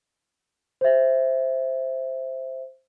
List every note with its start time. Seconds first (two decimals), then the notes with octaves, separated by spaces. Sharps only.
0.81 C5 E5